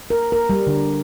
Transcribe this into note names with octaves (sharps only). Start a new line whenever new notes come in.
A#4
A#4
G3
D3